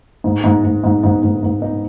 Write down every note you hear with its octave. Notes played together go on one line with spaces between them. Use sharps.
G#2
G#2
G#2
G#2
G#2
G#2
G#2
D#4